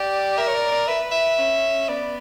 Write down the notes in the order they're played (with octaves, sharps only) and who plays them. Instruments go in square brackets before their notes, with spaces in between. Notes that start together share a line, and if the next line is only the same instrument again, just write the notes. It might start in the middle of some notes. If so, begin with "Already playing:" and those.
Already playing: [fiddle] G4 [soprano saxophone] D5
[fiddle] A#4 [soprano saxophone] E5
[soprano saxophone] C#5
D5
D5
[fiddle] B4 [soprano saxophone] E5
[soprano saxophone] E5
[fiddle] C#4
[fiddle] B3 [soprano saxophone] D5